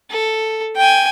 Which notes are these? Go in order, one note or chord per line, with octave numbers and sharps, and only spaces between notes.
A4
G5 G#5